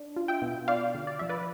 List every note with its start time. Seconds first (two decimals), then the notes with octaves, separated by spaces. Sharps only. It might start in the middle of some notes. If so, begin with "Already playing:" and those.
Already playing: D4
0.16 F4
0.28 E5 G5
0.42 B2
0.68 F4 D5 F5
0.95 D3
1.07 D5
1.19 F3 E5
1.29 B4 D5